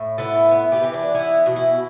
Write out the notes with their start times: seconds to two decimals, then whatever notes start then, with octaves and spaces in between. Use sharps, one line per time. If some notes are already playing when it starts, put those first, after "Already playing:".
Already playing: A2
0.18 B3 E4 A4
0.51 B3
0.72 G4 B4
0.83 E3
0.94 D4
1.14 B3 E4
1.46 B2
1.56 E4